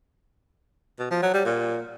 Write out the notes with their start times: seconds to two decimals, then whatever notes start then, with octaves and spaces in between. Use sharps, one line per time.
1.00 B2
1.11 F3
1.22 F#3
1.34 G3
1.45 A#2